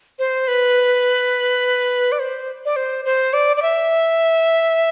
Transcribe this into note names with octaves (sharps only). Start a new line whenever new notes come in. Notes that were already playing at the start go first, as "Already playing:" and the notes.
C5
B4
D5
C5
D5
C5
C5
D5
D5
E5